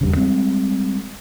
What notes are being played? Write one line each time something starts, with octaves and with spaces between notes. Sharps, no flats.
E2 G2 C#3
G3 G#3 C4